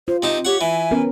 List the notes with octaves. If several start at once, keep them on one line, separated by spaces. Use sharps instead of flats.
F4 C5
C3 C4 D#4 A5
G4 C#5 F#5
E3 E5 G#5
B3 C#4 A#4